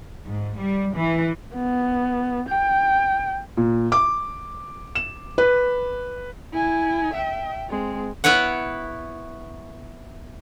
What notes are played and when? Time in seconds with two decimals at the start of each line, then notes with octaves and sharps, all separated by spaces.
0.25 G#2
0.57 G3
0.95 E3
1.54 B3
2.49 G5
3.57 A#2
3.92 D6
4.95 E7
5.38 B4
6.52 E4 G#5
7.14 E5 G5
7.69 G#3 C4
8.24 B3 E4 B4 C#5 F#5